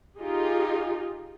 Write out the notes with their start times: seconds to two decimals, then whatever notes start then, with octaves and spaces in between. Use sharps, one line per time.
0.20 D#4 F4 G4 G#4